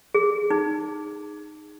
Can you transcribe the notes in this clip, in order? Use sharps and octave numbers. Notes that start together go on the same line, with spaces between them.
G#4
D#4